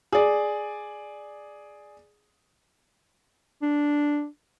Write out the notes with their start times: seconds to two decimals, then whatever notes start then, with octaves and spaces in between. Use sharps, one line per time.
0.12 G#4 D5
3.63 D4